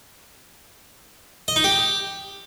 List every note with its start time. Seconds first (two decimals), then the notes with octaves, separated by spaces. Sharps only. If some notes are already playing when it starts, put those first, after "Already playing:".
1.48 D#5
1.56 D#4
1.64 G4